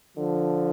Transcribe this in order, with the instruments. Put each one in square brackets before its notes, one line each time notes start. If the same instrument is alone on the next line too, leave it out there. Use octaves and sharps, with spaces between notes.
[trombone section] D3 F3